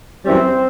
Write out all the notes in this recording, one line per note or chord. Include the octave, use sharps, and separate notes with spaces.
F#2 E3 G3 C4